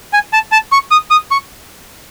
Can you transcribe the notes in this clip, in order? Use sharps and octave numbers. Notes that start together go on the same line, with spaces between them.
G#5
A5
A5
C#6
D#6
D#6
C#6